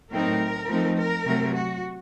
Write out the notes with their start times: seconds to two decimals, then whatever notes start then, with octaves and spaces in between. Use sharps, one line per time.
0.11 A2 F#3 C4 D#4 A#4
0.68 F3 A3 C4 D#4
0.96 A#4
1.25 C3 F#3 A3
1.54 F#4